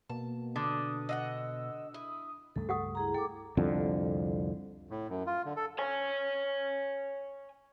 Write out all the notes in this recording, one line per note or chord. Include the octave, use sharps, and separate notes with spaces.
B2 A#3 A5
D3 D#6
D#5 F5 F#5 E6
E4 D#6
C#2 G2 A3 A4
G4 F#5 D#6
E4 G#4 A#5
A4 G5 D6
C2 F2 D3
A2
F#2
F4
D3
A4
C#5 G#5